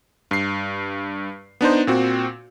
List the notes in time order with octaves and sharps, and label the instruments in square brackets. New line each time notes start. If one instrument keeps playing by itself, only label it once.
[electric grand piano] G2 C7
B3 D4 D#4 C5
A#2 C4 F#4